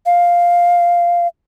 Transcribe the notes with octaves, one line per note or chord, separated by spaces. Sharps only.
F5